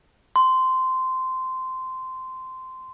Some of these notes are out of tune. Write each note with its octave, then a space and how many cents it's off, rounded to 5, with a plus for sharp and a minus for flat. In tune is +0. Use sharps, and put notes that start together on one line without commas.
C6 -15